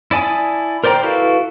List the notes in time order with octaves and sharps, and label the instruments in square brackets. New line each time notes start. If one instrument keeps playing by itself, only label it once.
[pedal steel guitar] E4 D5 G#5 A5 D#6
A#4 C5 D5 G5 A#5
E4 F#4 A4 B4 F5